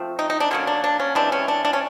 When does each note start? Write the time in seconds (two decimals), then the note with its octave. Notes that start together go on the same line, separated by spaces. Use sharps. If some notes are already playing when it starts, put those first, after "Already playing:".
Already playing: F3 A3 C4
0.19 D#4
0.30 D#4
0.40 D4
0.51 D3 F#3 A#3 C#4
0.67 D4
0.84 D4
1.00 C#4
1.15 C3 E3 G#3 C4 D4
1.32 C#4
1.48 D4
1.65 D4
1.73 C#4